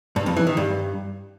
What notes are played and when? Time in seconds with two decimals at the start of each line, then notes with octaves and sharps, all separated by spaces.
0.16 G2
0.26 F2
0.36 E3
0.47 D#3
0.57 G2